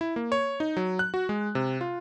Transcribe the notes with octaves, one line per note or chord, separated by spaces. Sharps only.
E4
A#3
C#5
D#4
F#3
F#6
F#4
G#3
C3
F4